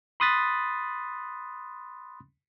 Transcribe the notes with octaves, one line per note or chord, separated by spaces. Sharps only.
B5 C6 D#6 F#6 A6 B6